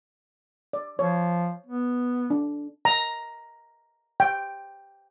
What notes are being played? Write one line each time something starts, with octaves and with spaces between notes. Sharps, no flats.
D5
F3 C#5
B3
D4
A#5
G5